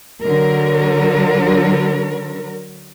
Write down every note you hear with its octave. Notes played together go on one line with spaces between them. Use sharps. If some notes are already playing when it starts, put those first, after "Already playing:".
D3 F#3 A#4